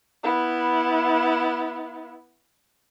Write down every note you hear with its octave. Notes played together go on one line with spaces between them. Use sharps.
B3 E4